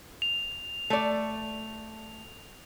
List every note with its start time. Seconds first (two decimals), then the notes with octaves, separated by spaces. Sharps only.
0.22 F7
0.90 A3 D5